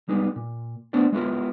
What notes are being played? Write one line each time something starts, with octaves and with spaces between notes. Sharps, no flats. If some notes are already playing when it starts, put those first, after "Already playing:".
G3 G#3 B3 D#4
A#2
A3 B3 D4 C5 D5
G#3 B3 E4 F4 A#4